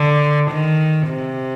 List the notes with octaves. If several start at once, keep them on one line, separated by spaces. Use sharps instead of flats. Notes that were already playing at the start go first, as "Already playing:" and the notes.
Already playing: D3
D#3
C3